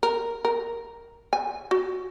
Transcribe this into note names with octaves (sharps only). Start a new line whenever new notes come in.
A#4
A#4
G#5
F#4